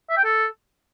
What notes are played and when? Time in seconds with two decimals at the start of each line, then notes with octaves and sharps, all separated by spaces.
0.10 E5
0.17 G5
0.24 A4